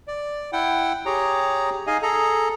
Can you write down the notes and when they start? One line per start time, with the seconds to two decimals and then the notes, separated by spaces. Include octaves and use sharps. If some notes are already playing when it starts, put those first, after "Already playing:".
0.08 D5
0.53 E4 F#5 G5
1.06 G4 G#4 C#5 A#5
1.87 D#4 G#4 D#5 F5 G#5
2.03 G#4 A4 A#5